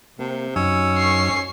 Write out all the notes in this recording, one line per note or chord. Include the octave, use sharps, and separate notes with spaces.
C3 A#3
F#2 F#3 C#4 D#4 E6
C#6 C7